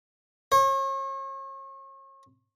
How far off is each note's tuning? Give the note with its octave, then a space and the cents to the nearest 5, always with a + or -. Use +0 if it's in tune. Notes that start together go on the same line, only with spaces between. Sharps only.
C#5 -40